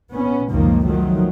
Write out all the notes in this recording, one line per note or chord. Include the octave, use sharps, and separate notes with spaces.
B3 C#4
F#1 C#2 F#2 D#3 F3 A#3
D#3 F3 F#3 A3